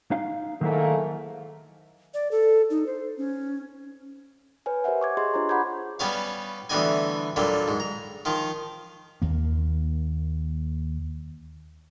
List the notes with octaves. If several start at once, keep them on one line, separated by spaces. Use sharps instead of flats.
D#4 F5
G#2 D#3 F#3 A3 A#3 E4
D5
A4
D#4
C5
C#4
B4 C#5 G#5
G4 A#4 C5 C#5 E5 F#5
C#6 D6 G#6
G4 G#4 D#5 C6
D4 F4 C5 C#5 A#5
F#5 A#5 B5 D6 G6 G#6
G3 B3 C#4 C#5 F5
D2 E3 G3 B3 D#5 G#5
A#2 D3 F#3 G3
G#2
A#5
D#3 F3 F4
D#2 A#3